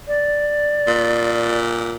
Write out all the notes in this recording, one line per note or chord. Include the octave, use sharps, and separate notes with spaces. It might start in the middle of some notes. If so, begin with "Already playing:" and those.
D5
A#2